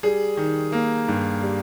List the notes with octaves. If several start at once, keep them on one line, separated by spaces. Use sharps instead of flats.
G3 G#4
D#3
A#3
G2
G3